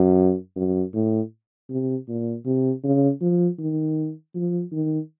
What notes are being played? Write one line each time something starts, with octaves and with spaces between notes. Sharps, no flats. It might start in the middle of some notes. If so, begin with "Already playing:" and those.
Already playing: F#2
F#2
A2
C3
A#2
C3
C#3
F3
D#3
F3
D#3